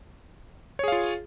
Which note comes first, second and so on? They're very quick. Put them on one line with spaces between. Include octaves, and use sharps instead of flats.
C#5 G#4 F5 F4